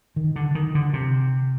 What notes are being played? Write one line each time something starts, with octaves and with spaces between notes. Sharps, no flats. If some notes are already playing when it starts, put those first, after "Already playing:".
D#3
D3
D#3
D3
C3